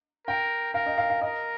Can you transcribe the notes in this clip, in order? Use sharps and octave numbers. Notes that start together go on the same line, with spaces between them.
A#4 G5
A#4 F5
D#5
F5
F5
A#4 D#5